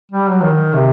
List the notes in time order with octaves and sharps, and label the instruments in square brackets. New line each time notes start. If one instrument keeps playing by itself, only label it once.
[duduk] G3
F#3
D#3
C3